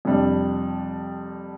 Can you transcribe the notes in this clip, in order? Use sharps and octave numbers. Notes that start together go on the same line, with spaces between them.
F2 C3 G3 D4